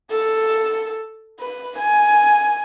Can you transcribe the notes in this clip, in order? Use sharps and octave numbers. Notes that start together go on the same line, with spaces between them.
A4
B4
G#5